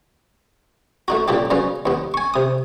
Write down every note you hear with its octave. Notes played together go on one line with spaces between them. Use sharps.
A3 D#4 F#4
A#2 C#3 D4 D#4 G4
C#3 F#3 B3 C#4
D#2 B3
G#5 C#6
C3 D#6